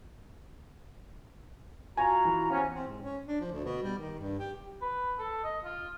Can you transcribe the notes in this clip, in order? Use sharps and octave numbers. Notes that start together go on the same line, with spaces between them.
F4 F#4 G#5 A#5
E3
C3 B3 C#4
C4
G#2
C#4
D4
F3
D2
B2
G3
D#3
G2
G4
B4
A4
D#5
F4